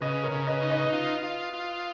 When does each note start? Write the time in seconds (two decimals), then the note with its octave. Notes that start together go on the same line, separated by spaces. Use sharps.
0.01 C#3 B4 D#5
0.24 A#4 C#5
0.32 C#3
0.47 B4 D#5
0.62 D#4
0.70 B4 D#5
0.92 F4
1.23 F4
1.54 F4